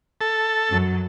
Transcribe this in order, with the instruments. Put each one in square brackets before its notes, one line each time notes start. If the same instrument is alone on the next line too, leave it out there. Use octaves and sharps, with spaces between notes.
[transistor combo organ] A4
[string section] F#2 F#3